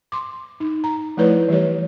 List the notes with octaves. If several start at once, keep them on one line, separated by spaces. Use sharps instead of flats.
C6 D6
D#4
A#5
F3 A3 E4 B4 C#5 D5
E3 G3 G4 C#5